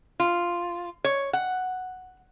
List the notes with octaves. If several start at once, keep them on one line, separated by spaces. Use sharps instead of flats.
F4
C#5
F#5